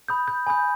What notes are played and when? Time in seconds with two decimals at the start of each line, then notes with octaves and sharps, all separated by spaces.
0.08 B5 D#6 G6
0.28 G6
0.47 G#5 B5 D#6 G6